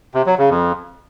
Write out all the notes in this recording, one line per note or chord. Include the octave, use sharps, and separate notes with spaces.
C3
F#3
C#3
F2